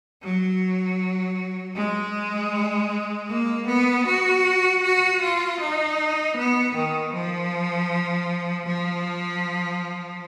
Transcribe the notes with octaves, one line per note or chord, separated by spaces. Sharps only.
F#3
G#3
A#3
B3
F#4
F#4
F4
D#4
B3
D#3
F3
F3